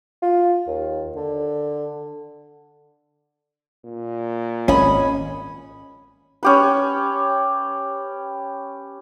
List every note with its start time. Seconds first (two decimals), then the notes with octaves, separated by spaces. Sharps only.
0.22 F4
0.67 D#2
1.16 D3
3.85 A#2
4.68 G#1 C#4 D#5 G#5 B5
6.43 C#4 G4 B4